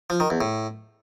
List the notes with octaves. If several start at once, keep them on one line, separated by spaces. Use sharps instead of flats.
F3
D#3
E2
A2